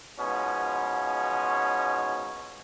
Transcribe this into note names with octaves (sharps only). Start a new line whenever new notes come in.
G#2 B2 F3 C#4